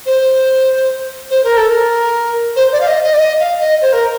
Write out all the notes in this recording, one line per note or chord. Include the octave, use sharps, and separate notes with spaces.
C5
C5
A#4
A4
A#4
C5
D5
F5
D#5
D#5
D5
D#5
F5
D#5
C5
A#4